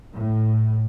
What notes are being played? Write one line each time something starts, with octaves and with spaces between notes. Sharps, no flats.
A2